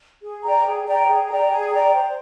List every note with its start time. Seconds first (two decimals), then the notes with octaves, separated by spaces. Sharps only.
0.22 G#4
0.44 D5 G5 A#5
0.65 G#4
0.86 D5 G5 A#5
1.08 G#4
1.29 D5 G5 A#5
1.50 G#4
1.71 D5 G5 A#5
1.93 C5